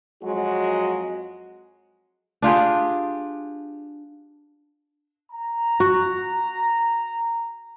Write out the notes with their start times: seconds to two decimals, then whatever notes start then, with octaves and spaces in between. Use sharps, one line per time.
0.23 F2 F#3 G#3 F#4
2.42 D4 F4 G4 G#4
5.32 A#5
5.80 F#4